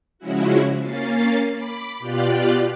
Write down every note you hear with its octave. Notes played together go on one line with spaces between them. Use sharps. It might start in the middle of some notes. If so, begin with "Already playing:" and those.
C#3 F3 G#3 C#4 E4 F#4
A#3 C#4 A6 C7
B5 D6
B2 F4 G4 D5 F#6